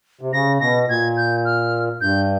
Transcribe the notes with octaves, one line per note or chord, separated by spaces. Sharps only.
C3
C#3 A#6
B2 A#6
A#2 G#6
G6
F6
G2 G6